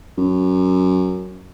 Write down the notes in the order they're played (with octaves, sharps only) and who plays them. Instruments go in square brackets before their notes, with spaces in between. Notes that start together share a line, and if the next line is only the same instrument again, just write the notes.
[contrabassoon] F#2